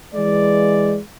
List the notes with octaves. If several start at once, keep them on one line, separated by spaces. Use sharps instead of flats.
E3 G#3 D5